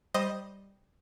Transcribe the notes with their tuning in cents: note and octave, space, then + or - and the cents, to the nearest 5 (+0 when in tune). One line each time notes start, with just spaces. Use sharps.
G3 +0 C5 +0 D#5 +0